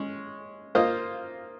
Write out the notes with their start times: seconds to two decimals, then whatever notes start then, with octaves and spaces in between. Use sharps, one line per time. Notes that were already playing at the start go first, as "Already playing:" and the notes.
Already playing: G#3 C#4
0.75 A#3 F4 C5 D#5